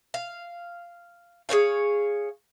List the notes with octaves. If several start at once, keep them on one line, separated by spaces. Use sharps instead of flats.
F5
G#4 B4 C#5 F5